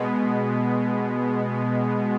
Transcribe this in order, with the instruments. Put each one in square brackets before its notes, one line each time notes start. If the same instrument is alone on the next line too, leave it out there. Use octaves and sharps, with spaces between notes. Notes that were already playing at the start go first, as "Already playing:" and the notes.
Already playing: [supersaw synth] B2 G#3 B3